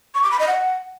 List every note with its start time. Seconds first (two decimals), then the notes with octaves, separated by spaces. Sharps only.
0.15 C#6
0.23 D6
0.31 B5
0.39 D#5
0.48 F#5